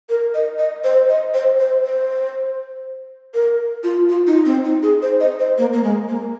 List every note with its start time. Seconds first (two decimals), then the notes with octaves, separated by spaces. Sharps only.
0.09 A#4
0.34 D#5
0.59 D#5
0.84 C5
1.09 D#5
1.34 C5
1.60 C5
1.84 C5
3.34 A#4
3.83 F4
4.09 F4
4.27 D#4
4.45 C4
4.65 D#4
4.83 G#4
5.02 C5
5.20 D#5
5.40 C5
5.58 A#3
5.73 A#3
5.84 G#3
6.09 A#3